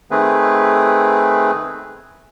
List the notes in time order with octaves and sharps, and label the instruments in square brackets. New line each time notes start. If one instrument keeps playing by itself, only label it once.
[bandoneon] D#3 A3 C4 G#4 B4